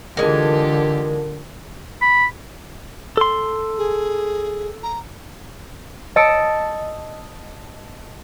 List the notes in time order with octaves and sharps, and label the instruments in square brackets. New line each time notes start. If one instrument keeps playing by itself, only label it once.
[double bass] D3 [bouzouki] E3 G#3 [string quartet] F4 G4 A4 [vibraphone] A#4
[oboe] B5
[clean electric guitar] A4 C6
[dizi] G#4
A#5
[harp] D#5 A5 E6 C#7 D7